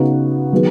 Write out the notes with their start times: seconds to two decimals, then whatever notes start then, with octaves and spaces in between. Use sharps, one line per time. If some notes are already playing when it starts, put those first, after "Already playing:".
Already playing: C#3 B3 D#4 F#4
0.52 D#3 F#3 B3 G#4